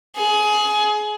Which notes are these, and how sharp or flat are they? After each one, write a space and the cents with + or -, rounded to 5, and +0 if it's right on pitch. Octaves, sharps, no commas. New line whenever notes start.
G#4 +20